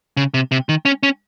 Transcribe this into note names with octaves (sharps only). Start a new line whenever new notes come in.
C#3
C3
C3
D#3
C#4
C#4